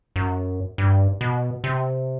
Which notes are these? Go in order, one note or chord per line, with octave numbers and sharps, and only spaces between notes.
F#2
G2
B2
C3